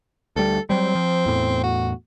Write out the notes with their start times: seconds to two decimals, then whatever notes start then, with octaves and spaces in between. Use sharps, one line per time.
0.36 D2 G3 A4
0.70 F#3 G3 C4
0.95 F3
1.26 E2 A2
1.63 F#4